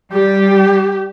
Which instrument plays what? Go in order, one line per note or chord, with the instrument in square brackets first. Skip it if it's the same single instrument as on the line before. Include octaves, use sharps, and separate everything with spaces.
[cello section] G3 [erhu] G4